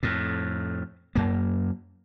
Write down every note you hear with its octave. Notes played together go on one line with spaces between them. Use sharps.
F2 A2
F#2 A#3